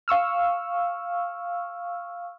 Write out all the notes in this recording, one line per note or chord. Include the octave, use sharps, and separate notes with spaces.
F5 C#6 E6 F6